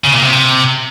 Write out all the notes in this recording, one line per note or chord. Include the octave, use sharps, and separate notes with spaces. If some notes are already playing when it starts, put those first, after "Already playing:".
C#3
A#2
C3